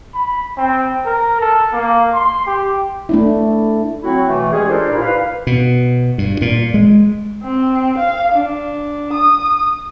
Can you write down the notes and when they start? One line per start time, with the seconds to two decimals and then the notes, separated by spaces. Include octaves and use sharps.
0.14 B5
0.57 C4
1.05 A#4
1.40 A4
1.73 A#3
2.14 C6
2.46 G4
3.09 A3 D4 E4
4.03 F#3 C4 E4 F#4
4.27 B2 E3 A3
4.52 G3 G#3 C#4 G4 G#4
4.68 D4 F4 A4 A#4 C5
4.90 A#2 D#4 E4 G4
5.02 B4 F5
5.47 B2
6.18 G2
6.42 A#2
6.74 G#3
7.44 C4
7.98 F5
8.33 D4
9.13 D#6